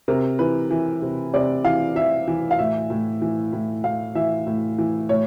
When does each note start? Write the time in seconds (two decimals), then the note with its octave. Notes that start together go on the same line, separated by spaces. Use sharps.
0.08 C3 A#4
0.39 E3 B4
0.71 E3
1.02 C3
1.34 C3 D5
1.64 E3 F5
1.96 E3 E5
2.28 E3
2.51 F5
2.58 A2 E5
2.90 A2
3.22 E3
3.52 A2
3.84 A2 F5
4.15 E3 E5
4.47 A2
4.78 E3
5.09 A2 C#5